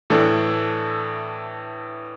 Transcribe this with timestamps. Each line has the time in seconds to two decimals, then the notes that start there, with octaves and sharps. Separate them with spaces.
0.10 A2 E3 A3 D4 A4